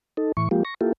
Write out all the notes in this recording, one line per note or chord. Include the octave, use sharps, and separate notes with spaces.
D#4 A4
A2 E3 C#6
F3 G#3 A#3 F4 G4
C#6 A#6
A#3 E4 F4 G4 A4